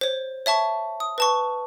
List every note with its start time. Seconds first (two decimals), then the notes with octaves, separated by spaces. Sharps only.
0.01 C5 C#5
0.46 C#5 E5 A5 C#6
1.00 D#6
1.18 B4 A5 C#6